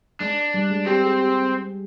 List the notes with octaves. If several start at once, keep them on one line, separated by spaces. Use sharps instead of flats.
G#3 D4
G3
G#3
C4 G4
G#4
G4